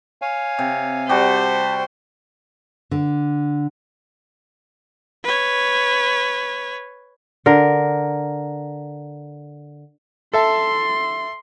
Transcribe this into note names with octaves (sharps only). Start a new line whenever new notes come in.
C#5 F5 G#5
C3
G3 F#4 G4 C5 A5
D3
B4 C#5
D3 A#4
A4 E5 A5 C6